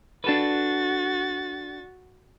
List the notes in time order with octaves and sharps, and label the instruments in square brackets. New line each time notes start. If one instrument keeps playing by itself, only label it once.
[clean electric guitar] D4 A4 B4 [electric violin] F#4 A6